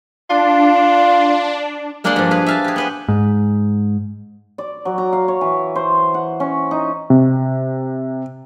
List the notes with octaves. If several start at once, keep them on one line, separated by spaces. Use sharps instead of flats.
D4 F4
G#3 A#3 D4 D5 F#5 C6
G2 F3
G#4 B4 F5
E5 F5 A5
G4 G#4
B3 B4 C5
G#2
D5
F#3
A#5
F5
C#5
E3
C5
F#5
C#4
D#4
C3